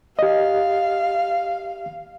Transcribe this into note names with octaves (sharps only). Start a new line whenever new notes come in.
G4 D#5 F5